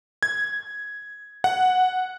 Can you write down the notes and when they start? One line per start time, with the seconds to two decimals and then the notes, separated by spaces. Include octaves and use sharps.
0.23 G#6
1.44 F#5